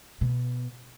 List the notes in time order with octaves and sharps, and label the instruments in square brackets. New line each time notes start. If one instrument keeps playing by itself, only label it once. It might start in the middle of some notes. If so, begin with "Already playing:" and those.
[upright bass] B2